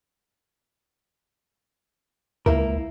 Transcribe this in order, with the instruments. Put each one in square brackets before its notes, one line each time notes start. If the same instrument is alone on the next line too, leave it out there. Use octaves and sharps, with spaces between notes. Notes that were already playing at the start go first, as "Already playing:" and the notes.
[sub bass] C#2 [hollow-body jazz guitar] A#3 E4 A#4